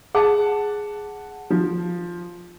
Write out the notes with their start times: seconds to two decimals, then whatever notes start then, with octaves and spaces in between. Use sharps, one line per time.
0.15 G#4 F#5 A5
1.50 F3